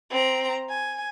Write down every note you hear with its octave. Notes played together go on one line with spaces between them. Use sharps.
C4 A#5
G#5